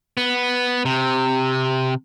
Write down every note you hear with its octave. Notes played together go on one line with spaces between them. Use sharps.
B3
C3